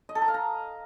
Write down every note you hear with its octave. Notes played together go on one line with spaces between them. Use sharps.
D#5
A4
A#5
F5
A#5